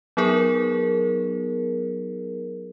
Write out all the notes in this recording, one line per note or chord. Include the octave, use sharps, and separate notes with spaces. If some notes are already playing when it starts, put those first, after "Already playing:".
F#3 B3 D#4 G#4 A#4